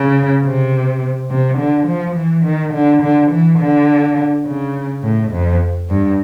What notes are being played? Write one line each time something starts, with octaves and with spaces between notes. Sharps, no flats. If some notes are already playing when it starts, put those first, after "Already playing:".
Already playing: C#3
C3
C3
D3
F3
E3
D#3
D3
D3
E3
D3
C#3
A2
F2
G2